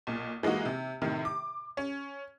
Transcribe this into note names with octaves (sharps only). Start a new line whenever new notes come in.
B1 A#2
E3 G#3 A#3 D#4 F#4
C3
A2 C3 D#3
D6
C#4